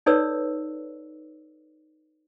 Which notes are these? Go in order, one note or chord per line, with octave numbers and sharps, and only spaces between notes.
D#4 A4 B4 C#5 D5 E6